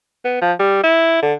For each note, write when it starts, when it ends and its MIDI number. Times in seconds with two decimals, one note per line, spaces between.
0.25 0.38 59
0.42 0.53 53
0.59 0.83 55
0.83 1.18 64
1.22 1.34 50